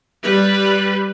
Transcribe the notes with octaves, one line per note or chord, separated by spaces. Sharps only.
G3 B4